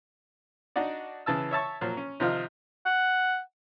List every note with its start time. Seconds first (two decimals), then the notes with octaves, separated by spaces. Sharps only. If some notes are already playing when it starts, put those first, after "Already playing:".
0.76 D4 D#4 F#4 D5
1.26 C#3 E3 A5 E6
1.51 C#5 E5 A5 C#6
1.81 A#2 F3 F#3
1.97 C#4
2.20 C3 D#3 F3 D#4 F4
2.86 F#5